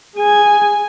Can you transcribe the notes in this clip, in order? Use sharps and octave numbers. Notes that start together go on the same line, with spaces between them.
G#4 G#5